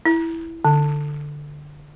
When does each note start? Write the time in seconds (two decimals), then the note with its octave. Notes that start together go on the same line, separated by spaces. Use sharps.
0.05 E4
0.65 D3